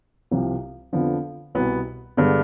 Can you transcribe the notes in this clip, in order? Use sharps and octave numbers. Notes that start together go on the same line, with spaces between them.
C2 C3 F3 C4
F2 D3 F3 B3
C2 B2 B3
G2 D3 G#3 B3